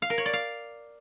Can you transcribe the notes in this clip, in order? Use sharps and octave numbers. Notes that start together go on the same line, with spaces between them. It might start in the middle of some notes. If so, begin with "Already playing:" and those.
F5
A#4
C#5
D5
F5